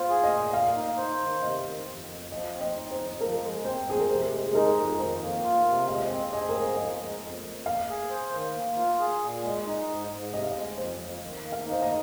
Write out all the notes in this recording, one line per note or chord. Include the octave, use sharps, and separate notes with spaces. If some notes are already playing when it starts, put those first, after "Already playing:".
Already playing: F4 C5
G#4
D#5
A#2
A#3 F5
D#4
C5
D#3
C3 D#5
D#3
F2
F2
F3 D#5
C4
D#5
D#4
C5
F2
F3 A#4
G#3
C4 C5
F2 G#4
A#4
C3 C5
G#3
G#4
D#4 A#4
F2
D#3 C5
A#3
F4
C3
G#3 F5
D#5
C5
C4 D#5
G#4 D#5
C5
A#4
G#2 C5
F3 D#5
G#3
F2
F2
A#3 F5
G#4
C5
D#3
A#3
F4
G#4
A#2
G#3
D#4
G#2
G#2
C3 D#5
F5
D#5
G#3
F2 C5
F2
D#3
A#3
F5
D#4
C5
D#5